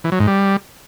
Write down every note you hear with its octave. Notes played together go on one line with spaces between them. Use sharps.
E3
F#3
G#2
G3